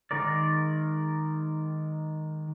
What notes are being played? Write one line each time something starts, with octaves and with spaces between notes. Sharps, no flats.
D#3 G#3 A#4 D5